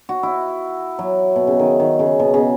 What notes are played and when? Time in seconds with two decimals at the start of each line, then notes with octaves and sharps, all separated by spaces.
0.09 F#4
0.23 E4
0.99 F#3
1.36 B2
1.47 C#3
1.59 D#3
1.79 D#3
1.99 C#3
2.20 B2
2.34 C#3